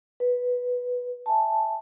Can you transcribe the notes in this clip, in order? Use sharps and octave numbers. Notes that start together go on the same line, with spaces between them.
B4
E5 G#5 A5